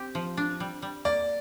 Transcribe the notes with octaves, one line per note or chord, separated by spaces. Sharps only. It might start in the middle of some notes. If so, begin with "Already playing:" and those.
Already playing: C4 G4
F3
D4
G3
G3
A#3 D5